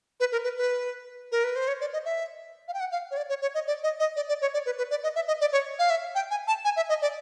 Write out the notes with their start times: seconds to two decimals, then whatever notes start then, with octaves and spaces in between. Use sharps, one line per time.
0.20 B4
0.32 A#4
0.44 B4
0.57 B4
1.32 A#4
1.44 B4
1.56 C5
1.68 C#5
1.81 D5
1.93 D#5
2.05 E5
2.68 F5
2.74 G5
2.80 F#5
2.92 F5
3.11 C#5
3.17 D5
3.29 C#5
3.42 C#5
3.54 D#5
3.67 D5
3.83 D#5
3.99 D#5
4.16 D5
4.29 D5
4.42 C#5
4.54 D5
4.66 B4
4.78 B4
4.91 D5
5.04 D#5
5.15 E5
5.27 D#5
5.41 D5
5.52 C#5
5.79 F5
5.90 E5
6.15 G5
6.31 G#5
6.47 A5
6.65 G#5
6.76 E5
6.89 D#5
7.02 D5